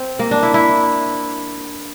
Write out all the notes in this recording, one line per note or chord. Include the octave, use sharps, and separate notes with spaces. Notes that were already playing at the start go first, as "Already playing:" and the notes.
Already playing: C4
A#3
D4
E4
E4